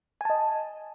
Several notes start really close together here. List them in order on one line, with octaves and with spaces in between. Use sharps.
G#5 A5 D#5